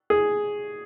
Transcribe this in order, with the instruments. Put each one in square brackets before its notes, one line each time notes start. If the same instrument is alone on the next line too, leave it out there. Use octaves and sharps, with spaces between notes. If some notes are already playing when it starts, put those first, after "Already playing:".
[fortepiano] G#4